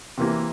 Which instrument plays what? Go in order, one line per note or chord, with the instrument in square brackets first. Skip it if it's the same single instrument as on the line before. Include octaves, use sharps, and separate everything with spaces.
[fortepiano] C3 E3 A#3